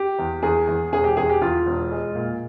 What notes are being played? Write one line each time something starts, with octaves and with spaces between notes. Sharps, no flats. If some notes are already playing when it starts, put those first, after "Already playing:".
Already playing: G4
E2
E2 G#4
E2
E1 G#4
G4
E2 G#4
G4
E2 F4
E1
G#3
A#2